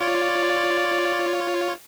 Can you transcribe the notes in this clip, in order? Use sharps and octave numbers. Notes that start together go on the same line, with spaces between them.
F4 C#5 D5